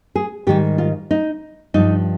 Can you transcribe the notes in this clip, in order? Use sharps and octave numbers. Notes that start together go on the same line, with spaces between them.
G#4
G#2 D#3 G3 G4
F4
D#4
G2 F3 D#4